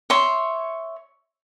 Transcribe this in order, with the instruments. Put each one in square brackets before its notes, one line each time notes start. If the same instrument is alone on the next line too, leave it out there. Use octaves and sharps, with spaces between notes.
[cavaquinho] C#5 E5 C6